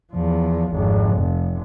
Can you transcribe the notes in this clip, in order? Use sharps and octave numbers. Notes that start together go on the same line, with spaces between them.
E2 F3
G#1 F2
F1